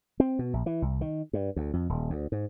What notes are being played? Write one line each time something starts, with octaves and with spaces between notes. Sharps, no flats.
C4
B2
A#1
E3
C2
D#3
G2
D2
F2
D#1
D2
G#2